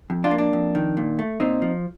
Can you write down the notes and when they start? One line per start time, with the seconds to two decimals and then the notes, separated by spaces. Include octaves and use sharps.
0.10 F2
0.24 D4 F4
0.31 A#3
0.38 D4
0.53 F2
0.75 D#3
0.97 A#2
1.19 A3
1.40 A#2 C4 D#4
1.62 F3